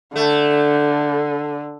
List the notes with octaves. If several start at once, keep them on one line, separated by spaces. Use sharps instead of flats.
D3 A3